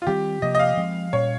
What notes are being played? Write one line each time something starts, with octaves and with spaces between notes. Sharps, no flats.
F4
D#3 G3 C4 G4
C3 F3 A#3 D#5
D#5
F5
F3 G#3 C4
A#2 G3 C#4 C#5